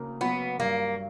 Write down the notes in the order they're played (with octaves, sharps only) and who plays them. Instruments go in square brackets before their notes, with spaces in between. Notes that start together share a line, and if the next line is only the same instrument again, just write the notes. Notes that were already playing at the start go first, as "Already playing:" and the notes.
Already playing: [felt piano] D2 C#3 A#3
[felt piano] F#3 [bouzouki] B3
[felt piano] G2 [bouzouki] A#3